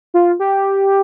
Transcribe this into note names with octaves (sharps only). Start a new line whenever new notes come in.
F4
G4